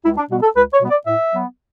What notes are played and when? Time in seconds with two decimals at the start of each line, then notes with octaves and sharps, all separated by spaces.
0.05 C#2 E4
0.18 D4
0.30 B2 G3 B3 F#4
0.43 A4
0.56 C#2 B4
0.74 C#5
0.81 B2 G3 B3
0.90 D5
1.06 A2 E5
1.32 F#3 B3